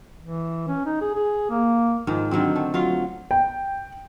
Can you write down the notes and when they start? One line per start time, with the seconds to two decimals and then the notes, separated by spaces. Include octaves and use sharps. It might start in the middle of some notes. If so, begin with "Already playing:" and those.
0.23 E3
0.68 C#4
0.86 D#4
1.01 G#4
1.14 G#4
1.50 A#3
2.07 G#2 D#3 F3
2.31 D3 D#3 F#3 C4
2.56 A3
2.74 F#3 F4 F5
3.31 G5